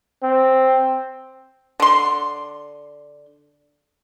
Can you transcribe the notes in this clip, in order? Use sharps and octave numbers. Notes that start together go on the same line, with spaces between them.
C4
D3 C6